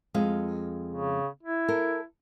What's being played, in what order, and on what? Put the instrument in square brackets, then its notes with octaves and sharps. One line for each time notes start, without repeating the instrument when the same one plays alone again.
[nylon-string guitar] F2 G#3 F5
[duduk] C#3
E4
[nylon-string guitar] A4 A#4